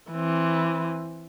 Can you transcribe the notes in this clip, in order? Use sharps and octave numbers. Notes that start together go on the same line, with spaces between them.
E3 C4